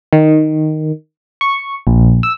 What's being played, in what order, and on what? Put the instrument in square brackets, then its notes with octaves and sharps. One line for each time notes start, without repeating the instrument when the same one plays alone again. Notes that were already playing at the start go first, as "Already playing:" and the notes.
[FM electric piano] D#3
C#6
A#1
E6